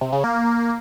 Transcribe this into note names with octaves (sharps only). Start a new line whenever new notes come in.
C3
C#3
A#3